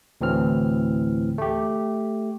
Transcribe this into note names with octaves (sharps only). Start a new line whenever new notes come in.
D2 A2 E3 C4 F6
A3 G4